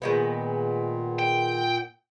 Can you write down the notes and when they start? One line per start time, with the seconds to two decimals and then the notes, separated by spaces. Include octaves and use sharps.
0.02 A#2 D#3 G#3 B3
1.19 G5